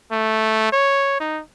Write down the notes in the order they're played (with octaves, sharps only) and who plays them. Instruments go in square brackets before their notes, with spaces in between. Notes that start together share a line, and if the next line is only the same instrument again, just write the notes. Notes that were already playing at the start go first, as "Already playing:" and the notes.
[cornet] A3
C#5
D#4